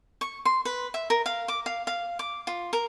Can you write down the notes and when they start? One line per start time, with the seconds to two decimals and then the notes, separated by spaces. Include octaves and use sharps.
0.21 C#6
0.45 C6
0.65 B4
0.94 E5
1.10 A#4
1.26 F5
1.48 D6
1.66 F5
1.87 F5
2.19 D6
2.47 F4
2.73 A#4